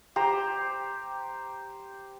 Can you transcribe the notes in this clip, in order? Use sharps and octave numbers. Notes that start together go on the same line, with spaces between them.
G4 C5 A#5